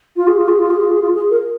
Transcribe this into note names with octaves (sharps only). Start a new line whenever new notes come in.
F4
G#4
F4
G#4
F4
G#4
F4
G#4
F4
G#4
A#4